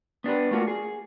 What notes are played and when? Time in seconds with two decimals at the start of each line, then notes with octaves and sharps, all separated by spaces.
0.24 B3 D4 G4 B4
0.51 A3 A#3 F4 F#4
0.67 G#4